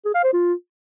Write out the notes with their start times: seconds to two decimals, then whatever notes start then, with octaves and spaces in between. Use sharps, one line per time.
0.05 G#4
0.14 F5
0.24 C5
0.33 F4